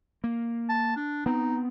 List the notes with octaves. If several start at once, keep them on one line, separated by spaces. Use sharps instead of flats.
A#3
A5
D4
B3 C4 D#4